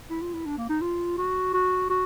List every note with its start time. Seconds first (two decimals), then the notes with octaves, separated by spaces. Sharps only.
0.10 E4
0.22 F4
0.34 E4
0.46 D4
0.57 A#3
0.69 D#4
0.81 F4
1.18 F#4
1.54 F#4
1.90 F#4